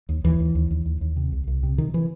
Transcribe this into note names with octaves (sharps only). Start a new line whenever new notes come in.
D#2
D#2 E3
D#2
D#2
D#2
D#2
D#2
C3
C2
C2
C3
C3 D#3
E3